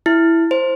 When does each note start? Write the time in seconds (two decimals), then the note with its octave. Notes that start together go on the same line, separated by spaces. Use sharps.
0.06 E4
0.51 C5